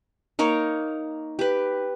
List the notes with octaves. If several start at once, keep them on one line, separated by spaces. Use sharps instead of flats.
A#3 D#4 A#4 C#5
G4 B4